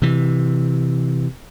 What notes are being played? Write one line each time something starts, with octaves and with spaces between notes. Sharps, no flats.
C3 E3